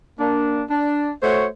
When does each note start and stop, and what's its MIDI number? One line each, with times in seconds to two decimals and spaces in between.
0.20 0.63 58
0.20 0.63 62
0.70 1.12 62
1.22 1.46 57
1.22 1.46 66
1.22 1.46 72
1.22 1.46 73